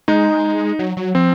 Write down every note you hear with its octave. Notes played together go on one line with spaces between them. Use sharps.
G#3 D#4
F#3
F#3
F3 C4